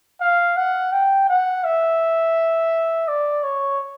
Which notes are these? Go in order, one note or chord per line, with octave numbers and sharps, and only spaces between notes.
F5
F#5
G5
F#5
E5
D5
C#5